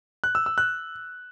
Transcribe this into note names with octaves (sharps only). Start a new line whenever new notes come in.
F#6
E6
E6
F#6